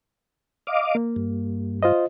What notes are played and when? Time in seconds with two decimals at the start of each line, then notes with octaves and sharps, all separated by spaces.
0.67 D#5 F5 D6
0.95 A#3
1.16 G2
1.83 F4 C5 D#5